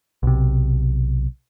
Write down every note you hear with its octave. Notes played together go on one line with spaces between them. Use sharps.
B1 C3